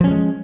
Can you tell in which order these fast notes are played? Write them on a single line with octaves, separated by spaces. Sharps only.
F3 C#4 G3 G#3